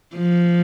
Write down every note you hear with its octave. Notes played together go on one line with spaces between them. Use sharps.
F3